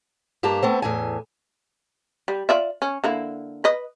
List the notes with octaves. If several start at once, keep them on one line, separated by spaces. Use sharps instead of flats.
G2 A#3 G4 A5 A#5
A3 B3 C4
E2 A2 G#5
G3
F4 D5 E5
C#4
D3 A#3 E4
B4 D#5